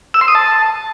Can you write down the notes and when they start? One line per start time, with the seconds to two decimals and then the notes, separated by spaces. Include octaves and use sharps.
0.14 E6
0.21 C6
0.28 D#6
0.35 A5